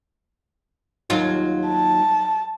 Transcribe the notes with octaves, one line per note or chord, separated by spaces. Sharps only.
D#2 F#3 F4
A5